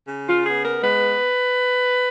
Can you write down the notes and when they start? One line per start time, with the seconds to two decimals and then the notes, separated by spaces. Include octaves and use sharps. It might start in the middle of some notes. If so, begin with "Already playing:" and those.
0.08 C#3
0.27 F4
0.45 B3 G#4
0.63 A#4
0.81 G#3 B4